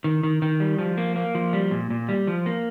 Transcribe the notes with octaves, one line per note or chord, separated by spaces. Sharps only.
D#3
D#3
D#3
G3
F3
A#3
A#3
F3
G3
A#2
A#2
G3
F3
A#3